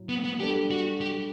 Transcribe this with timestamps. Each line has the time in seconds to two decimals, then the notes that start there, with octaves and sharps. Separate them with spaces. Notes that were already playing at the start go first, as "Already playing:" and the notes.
Already playing: A2 F#3
0.09 B3
0.24 B3
0.40 G3 D4 G4 A4
0.71 F#4
1.01 G4